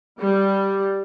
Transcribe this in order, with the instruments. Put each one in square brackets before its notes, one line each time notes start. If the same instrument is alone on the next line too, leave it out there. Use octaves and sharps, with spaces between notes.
[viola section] G3